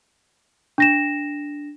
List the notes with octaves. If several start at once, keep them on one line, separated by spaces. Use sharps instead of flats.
D4 A#6 E7